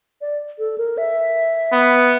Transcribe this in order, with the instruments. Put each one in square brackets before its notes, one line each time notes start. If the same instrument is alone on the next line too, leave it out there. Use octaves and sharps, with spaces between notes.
[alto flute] D5
A4
A#4
E5
[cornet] B3